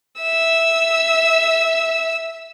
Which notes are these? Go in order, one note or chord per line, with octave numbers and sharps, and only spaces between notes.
E5 E6